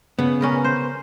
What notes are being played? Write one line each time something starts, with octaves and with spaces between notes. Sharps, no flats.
C#3 B3
C#4 A#4 B4
C5